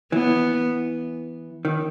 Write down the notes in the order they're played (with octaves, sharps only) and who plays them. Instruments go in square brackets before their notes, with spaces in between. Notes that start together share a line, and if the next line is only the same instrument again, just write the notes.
[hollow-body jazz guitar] E3 [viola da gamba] B3
[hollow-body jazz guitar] D#3